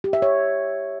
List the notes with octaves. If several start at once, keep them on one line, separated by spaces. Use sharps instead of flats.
G4
E5
C#5